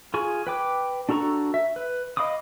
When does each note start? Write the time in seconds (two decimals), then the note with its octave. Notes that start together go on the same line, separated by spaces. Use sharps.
0.14 F4 G#4 G#5 C#6
0.47 B4 G5 D6
1.09 D4 F#4 A4 A#5 C#6
1.54 E5
1.76 B4
2.17 D#5 F5 B5 D6 D#6